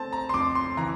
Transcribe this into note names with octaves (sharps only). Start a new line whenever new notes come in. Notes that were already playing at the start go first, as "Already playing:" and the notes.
Already playing: A3 C4 A5
A#5
C6
F2 D6
C6
E3 A#5